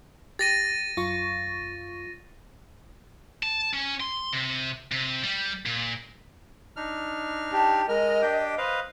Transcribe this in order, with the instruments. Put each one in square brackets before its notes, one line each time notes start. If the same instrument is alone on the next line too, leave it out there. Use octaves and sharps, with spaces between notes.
[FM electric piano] G4 [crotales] A6 A#6 D#7
[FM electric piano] F#2 F4 C#6
[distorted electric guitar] A5
C#4
C6
C3
C3
G3
A#2
[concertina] D4 D#4 F6
[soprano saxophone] G4 [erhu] A5
[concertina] G#3 F6 [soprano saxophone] A#4 [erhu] D#5
[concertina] D4 G4 G5
[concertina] B4 D#5 F5 [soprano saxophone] C5